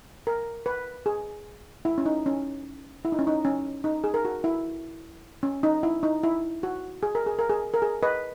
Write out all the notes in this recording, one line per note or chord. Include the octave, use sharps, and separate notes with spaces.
A#4
B4
G#4
E4
C#4
D#4
C#4
E4
D#4
C#4
D#4
C#4
D#4
G#4
A#4
F#4
E4
C#4
D#4
E4
D#4
E4
F#4
G#4
A#4
G#4
A#4
G#4
A#4
G#4
B4 D#5